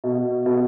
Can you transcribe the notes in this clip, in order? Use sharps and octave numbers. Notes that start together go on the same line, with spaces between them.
B2
B2